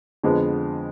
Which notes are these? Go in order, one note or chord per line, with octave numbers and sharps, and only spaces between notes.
F2 D3 G#3 B3